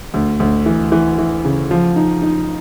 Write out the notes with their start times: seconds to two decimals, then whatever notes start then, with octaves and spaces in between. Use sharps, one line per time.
0.14 D2
0.40 D2
0.66 E3
0.92 E3
1.18 E3
1.45 C#3
1.71 F3
1.96 D#4
2.22 D#4